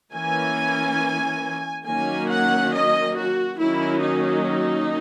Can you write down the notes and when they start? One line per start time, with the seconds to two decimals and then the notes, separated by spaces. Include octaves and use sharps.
0.13 E3 A#3 C#4 G#5
1.86 D#3 F#3 A#3 C#4 G#5
2.30 F#5
2.73 D#5
3.16 F#4
3.59 D#3 F#3 A#3 C#4 E4
4.03 D#4